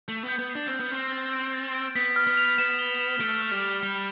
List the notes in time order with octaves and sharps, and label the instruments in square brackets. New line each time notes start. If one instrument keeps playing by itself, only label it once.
[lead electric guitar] A3 [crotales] G6
[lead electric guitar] B3
[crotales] G6
[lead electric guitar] B3
[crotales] C7
[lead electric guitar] D4
[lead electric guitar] C4 [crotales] F6
[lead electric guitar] B3
[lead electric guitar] C4 [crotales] F6
[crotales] A6
D7
A6
D7
[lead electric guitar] B3 [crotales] B6
[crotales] F6
[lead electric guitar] B3
[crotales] F7
[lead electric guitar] B3 [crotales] E7
[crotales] G7
E7
[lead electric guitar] A3 [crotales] D7
[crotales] F6
[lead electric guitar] G3
[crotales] D7
[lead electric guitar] G3 [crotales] G7